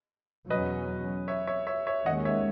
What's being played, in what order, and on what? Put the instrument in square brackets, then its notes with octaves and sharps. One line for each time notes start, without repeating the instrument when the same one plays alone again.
[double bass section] E2 B2 F#3 C#4 [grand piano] B4 D#5
[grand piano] C#5 E5
C#5 E5
C#5 E5
C#5 E5
[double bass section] D#2 D#3 G#3 C#4 [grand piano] D#5 F#5
[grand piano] C#5 E5